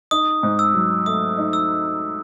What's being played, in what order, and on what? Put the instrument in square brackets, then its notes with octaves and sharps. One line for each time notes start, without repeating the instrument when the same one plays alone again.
[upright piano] D#4 [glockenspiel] D#6
[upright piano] G#2
[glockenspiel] E6
[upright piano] F#3
[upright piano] A3 [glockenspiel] D#6
[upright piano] D#4
[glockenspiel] E6